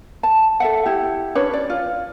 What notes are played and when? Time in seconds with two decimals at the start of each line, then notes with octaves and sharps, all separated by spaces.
0.23 A5
0.60 A4 E5 F#5
0.86 E4 G4
1.35 C#4 D4 B4 C#5
1.53 D5
1.70 F4